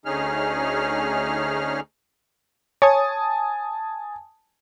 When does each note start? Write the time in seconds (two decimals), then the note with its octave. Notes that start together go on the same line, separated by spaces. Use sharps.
0.06 D2 D3 C#4 D#4 G#4 F6
2.82 C#5 G#5 A5 D#6